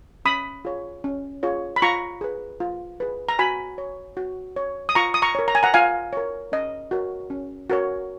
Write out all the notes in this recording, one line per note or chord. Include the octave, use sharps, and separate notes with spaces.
C#4 B5 D#6
F4 G#4 C#5
C#4
F4 G#4 C#5
B5
F4 A#5 C#6
G#4 B4
F4
G#4 B4
A#5
F#4 G#5 B5
C#5
F#4
C#5
D#6
F4 A#5 C#6
D#6
A#5 C#6
A#4 C#5
A#5
G#5
F#5 A#5
F4 F5 G#5
A#4 C#5
C#4 D#5
F#4 A#4 C#5
C#4
F#4 A#4 C#5